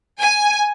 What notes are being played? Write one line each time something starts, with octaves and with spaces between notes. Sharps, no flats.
G#5